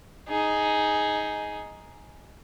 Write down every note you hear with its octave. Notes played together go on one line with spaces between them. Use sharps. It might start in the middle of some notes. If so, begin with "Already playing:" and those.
D#4 G#4